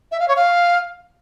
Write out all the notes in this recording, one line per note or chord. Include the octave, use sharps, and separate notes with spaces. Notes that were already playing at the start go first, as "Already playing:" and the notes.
E5
F5
C#5
F5